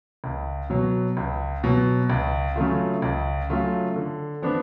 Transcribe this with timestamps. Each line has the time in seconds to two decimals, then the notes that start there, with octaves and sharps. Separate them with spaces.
0.24 C#2
0.70 B2 F#3
1.17 C#2
1.64 B2 F#3
2.10 C#2
2.56 C#3 F#3 A3 F4
3.02 C#2
3.50 C#3 F#3 A3 F4
3.96 D3
4.42 F3 B3 D4